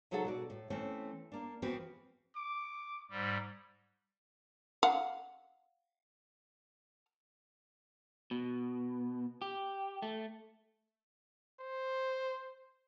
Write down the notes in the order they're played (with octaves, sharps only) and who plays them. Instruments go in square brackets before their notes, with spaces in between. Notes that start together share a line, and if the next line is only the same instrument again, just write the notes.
[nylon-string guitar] C3 F#3 D#4 G#4 A4 F#5
B2 F#4 D5
A2
E3 A3 C4 C#4
A#3 D4
E3 F3 B3 C4 F#4 B4
[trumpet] D6
[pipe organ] G#2 G3
[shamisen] F5 F#5
[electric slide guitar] B2
G4
A3
[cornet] C5